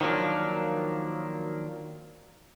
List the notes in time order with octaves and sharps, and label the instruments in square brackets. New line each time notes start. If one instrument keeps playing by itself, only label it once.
[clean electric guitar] D#3 F3 F#3 A#3 D4